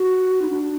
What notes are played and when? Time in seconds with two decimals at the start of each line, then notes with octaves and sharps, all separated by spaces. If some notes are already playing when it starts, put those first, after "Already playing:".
Already playing: F#4
0.42 D#4
0.49 D4